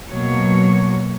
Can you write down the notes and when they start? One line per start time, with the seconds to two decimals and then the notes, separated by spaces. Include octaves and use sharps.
0.10 B2 F#3 A#3 C#5